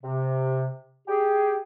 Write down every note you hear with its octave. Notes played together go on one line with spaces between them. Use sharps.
C3
G4 G#4